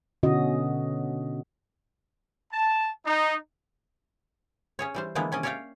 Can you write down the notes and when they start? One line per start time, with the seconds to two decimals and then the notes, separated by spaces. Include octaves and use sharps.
0.23 B2 D3 C#4 F#4 D#5
2.52 A5
3.06 D#4
4.79 C#4 G#4 C#5
4.94 E3 G3 C5
5.15 D3 E3 F3 G#3 A#3 B3
5.32 C3 C#4 D5 D#5
5.43 C#4 C#5 D5 E5 F5 G5